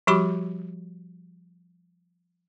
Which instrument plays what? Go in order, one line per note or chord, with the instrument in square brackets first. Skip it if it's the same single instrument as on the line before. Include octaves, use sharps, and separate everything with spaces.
[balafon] F3 G3 F#4 G4 B5 D6